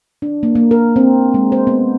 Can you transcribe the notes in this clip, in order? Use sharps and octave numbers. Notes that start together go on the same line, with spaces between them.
D4
A#3
A#3
A#4
C4
G#3
C5
B3